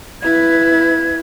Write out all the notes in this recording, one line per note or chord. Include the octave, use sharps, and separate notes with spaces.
E4 B4 G#6